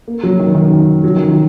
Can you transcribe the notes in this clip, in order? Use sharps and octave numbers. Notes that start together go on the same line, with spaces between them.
A#3
F#3
D#3
D#3
F#3
D#3
F#3